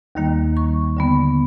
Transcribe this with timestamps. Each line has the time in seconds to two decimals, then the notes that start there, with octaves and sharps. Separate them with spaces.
0.15 D#2 D#3 G3 A#3
0.57 C#6
0.97 D3 G3 B3